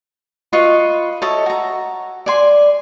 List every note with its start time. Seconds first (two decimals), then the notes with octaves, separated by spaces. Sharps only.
0.53 F4 B4 D#5 C#6
1.22 A4 C#5 D#5 E5
1.46 F#4 A#5
2.26 D5 G#5 C6